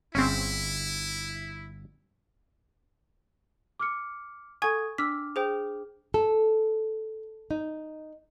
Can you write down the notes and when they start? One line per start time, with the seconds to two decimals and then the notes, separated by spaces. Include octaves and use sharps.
0.15 G1 C4 C#4 E4 G#4
3.80 D6 F6 C#7
4.62 A4 F#5 G#5 C#6 D#6 G#6
4.98 D4 D6 E6 F6 B6
5.36 G#4 C5 G5
6.14 A4
7.51 D#4